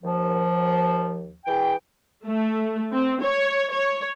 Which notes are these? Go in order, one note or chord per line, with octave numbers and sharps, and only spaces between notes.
D#2 F3
E3 G#4 G5
A3
C4
C#5
C#5